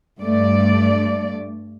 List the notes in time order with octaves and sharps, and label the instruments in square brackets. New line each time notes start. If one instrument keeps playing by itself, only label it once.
[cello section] G2 A3 D5